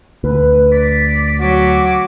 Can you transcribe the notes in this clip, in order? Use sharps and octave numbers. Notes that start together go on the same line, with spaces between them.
D2 B4
D5 B6
F#3 D6